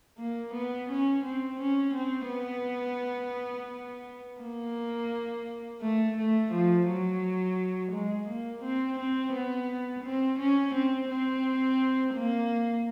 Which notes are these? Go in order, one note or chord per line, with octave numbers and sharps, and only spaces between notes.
A#3
B3
C#4
C4
C#4
C4
B3
A#3
A3
A3
F3
F#3
G#3
A#3
C4
C4
B3
C4
C#4
C4
C4
A#3